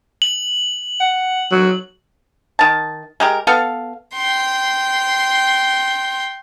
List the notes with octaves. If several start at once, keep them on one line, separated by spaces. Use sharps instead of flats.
F#7
F#5
F#3
D#3 A5
G#3 G4 A#4
B3 A4 F5
G5 C6